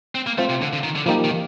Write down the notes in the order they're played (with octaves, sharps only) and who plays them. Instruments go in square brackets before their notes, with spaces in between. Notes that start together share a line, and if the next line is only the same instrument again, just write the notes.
[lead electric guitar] C4
A#3
[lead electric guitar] A3 [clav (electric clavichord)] C4 F4 C5 F5
[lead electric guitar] C3
D3
D3
D#3
D3
[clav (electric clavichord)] F3 A#3 D#4 G4 [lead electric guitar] G3
[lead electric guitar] D#3